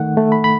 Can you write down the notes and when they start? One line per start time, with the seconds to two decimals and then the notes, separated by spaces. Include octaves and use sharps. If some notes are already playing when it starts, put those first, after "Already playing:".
Already playing: D#3 A3 F#5
0.17 A3
0.32 B5
0.44 B5